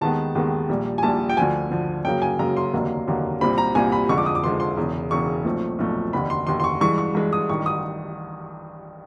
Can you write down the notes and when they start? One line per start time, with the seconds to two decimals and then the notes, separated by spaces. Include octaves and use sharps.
0.01 D#2 D#3 G#3 B3 A5
0.35 D#2 D#3 G#3 B3
0.69 A#1 A#2 G3
0.98 G#5
1.03 A#1 A#2 G3 A5
1.29 G5
1.37 D2 D3 F3 G#5
1.71 D2 D3 F3
2.05 F#2 C#3 F#3 A#3 G5
2.22 G#5
2.39 F#2 C#3 F#3 A#3 A#5
2.57 C6
2.73 F1 D#2 D3 F#3 A#3
3.07 F1 D#2 D3 F#3 A#3
3.41 C2 A#2 G3 C4 B5
3.58 A#5
3.75 C2 A#2 G3 C4 G#5
3.92 B5
4.09 F1 F2 D3 F3 G#3 C#6
4.18 D6
4.26 D#6
4.35 D6
4.43 F1 F2 D3 F3 G#3 C6
4.60 C6
4.77 E1 E2 C#3
5.11 E1 E2 C#3 C#6
5.45 B1 A#2 F3 A3 C4
5.79 B1 A#2 F3 A3 C4
6.13 F1 D#2 D3 B5
6.30 C6
6.47 F1 D#2 D3 C6
6.60 C6
6.64 C#6
6.81 G2 E3 G#3 C#6
6.98 C#6
7.15 G2 E3 G#3
7.33 D#6
7.49 A1 G2 D#3 C#6
7.66 D#6